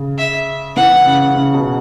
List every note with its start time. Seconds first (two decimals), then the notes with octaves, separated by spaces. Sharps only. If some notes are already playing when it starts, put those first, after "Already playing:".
Already playing: C#3
0.18 E5
0.76 E3 F#5
1.06 C#3
1.35 C#3
1.54 B2